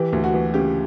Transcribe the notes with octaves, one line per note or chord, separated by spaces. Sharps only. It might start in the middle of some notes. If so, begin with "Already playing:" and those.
Already playing: E3 G4
D2
F#4
E3
C#3 G4